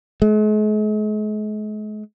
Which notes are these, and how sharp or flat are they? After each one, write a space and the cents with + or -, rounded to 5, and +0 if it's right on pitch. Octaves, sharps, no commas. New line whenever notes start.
G#3 +40